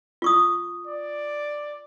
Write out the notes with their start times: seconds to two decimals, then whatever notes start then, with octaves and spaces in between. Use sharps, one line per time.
0.22 F4 C#6 D#6
0.87 D5